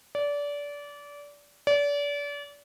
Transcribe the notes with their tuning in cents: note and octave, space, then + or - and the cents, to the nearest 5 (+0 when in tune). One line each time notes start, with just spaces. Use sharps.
D5 -25
D5 -35